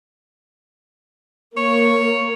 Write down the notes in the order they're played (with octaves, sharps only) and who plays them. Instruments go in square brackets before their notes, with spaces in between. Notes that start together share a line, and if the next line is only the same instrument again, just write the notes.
[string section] A#3 [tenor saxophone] C#5